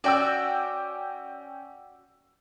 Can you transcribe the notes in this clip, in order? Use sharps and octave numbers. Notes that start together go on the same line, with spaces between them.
C#4 F#4 D5 G5 E6